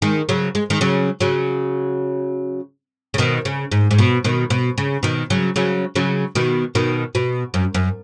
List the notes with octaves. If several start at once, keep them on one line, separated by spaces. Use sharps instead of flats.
D#3 G#3
C#3 F#3
G#3
D#3 G#3
C#3 F#3
C#3 F#3
C#3
B2 D#3
C#3
G#2
G#2
B2
B2 D#3
B2
C#3
B2 D#3
C#3 F#3
C#3 F#3
C#3 F#3
B2 D#3
B2 D#3
B2
F#2
F#2